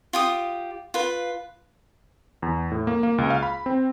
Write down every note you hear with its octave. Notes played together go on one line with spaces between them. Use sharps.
F4 G4 D#6
F4 B4
E2
A2
A#3
A#3
C#2
F5
B5
C4